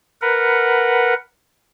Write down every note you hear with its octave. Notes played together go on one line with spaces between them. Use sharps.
A#4 B4 F#5